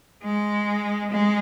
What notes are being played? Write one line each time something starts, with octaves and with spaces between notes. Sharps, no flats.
G#3
G#3